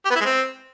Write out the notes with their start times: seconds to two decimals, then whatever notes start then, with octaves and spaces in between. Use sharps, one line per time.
0.05 G4
0.10 B3
0.15 E4
0.20 G#3
0.25 C4